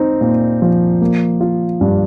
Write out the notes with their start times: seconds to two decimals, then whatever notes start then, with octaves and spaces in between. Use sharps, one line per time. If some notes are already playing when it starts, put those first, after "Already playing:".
Already playing: C4 D#4
0.21 A#2
0.62 F3
1.01 A#3
1.41 F4
1.81 G2